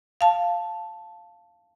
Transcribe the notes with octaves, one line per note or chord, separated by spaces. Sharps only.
F5 A5